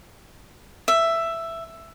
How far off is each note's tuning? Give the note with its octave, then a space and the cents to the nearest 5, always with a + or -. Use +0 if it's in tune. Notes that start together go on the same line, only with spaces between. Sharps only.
E5 +10